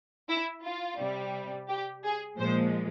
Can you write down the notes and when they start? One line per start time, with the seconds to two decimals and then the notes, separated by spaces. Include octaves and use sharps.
0.29 E4
0.64 F4
0.99 C3 G3
1.69 G4
2.04 G#4
2.39 A#2 F3 G#3 C5